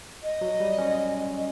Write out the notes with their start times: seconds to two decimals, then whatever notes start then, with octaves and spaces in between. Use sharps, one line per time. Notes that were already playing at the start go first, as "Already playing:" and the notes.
0.22 D#5
0.41 F#3
0.60 G3
0.78 C#4
1.36 D#5